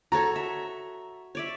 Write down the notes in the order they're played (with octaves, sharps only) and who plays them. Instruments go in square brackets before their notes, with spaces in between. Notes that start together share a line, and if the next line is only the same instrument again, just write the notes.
[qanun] F#4 A4 C#5 [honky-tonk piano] A#5
[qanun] E5
C#5 D5 E5